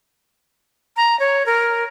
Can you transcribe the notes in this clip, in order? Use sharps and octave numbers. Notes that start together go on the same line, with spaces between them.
A#5
C#5
A#4